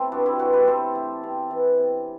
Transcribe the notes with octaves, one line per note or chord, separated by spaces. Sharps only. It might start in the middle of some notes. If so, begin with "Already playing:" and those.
Already playing: A3 C4 E4 A4 C5
G2 D4 F#4
E4 G4
E3 F#4 A4
G4 B4
C3 A4 C5
A3
C3
E3
C3